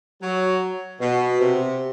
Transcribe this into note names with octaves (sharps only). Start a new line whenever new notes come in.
F#3
B2
C3